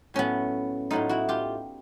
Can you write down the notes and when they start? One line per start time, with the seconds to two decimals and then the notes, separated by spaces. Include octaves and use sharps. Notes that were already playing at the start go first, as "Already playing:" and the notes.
0.14 A2 F#3 A3 B3 C#4
0.91 A2 F#3 A3 D#4 F4
1.09 E4 F#4
1.29 F4 G4